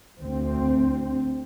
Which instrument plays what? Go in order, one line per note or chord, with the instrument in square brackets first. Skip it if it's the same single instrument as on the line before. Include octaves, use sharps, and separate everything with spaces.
[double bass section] D2 C4